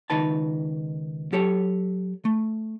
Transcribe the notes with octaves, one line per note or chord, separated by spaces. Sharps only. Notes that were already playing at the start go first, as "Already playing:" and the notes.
C#2 D#3 D#4 B4 A5
F#3 G4 A4 C#5
A3